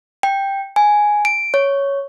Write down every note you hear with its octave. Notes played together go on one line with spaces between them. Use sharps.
G5
G#5
D7
C#5